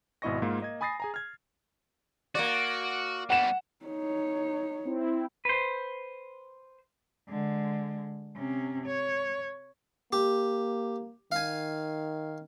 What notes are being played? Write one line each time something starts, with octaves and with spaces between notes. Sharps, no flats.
G#1 B2 E4 D#5 C#6 A#6
G#2 A#3 F4
A#3 D#5 G#6
G#5 B5 D#6 A6 A#6 C7
G#4 G#5 A#5
F6 G#6
A#3 F#4 D5
B2 G3 F#5 E7
D#4 C#5
C4 E4
B4 C5
D3 G#3
C3 C#4
C#5
A#3 G4
D#3 F5 G#5